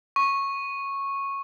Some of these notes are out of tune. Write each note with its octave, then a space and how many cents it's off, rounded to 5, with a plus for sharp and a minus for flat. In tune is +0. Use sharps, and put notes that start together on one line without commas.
C#6 -10